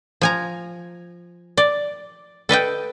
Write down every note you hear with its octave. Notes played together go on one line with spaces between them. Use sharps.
F3 G#5 A#5
D5
A4 B4 D#5 G5